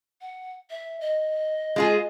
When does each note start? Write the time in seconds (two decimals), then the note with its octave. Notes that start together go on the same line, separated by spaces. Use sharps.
0.21 F#5
0.70 E5
1.00 D#5
1.76 G#3 F4 G#4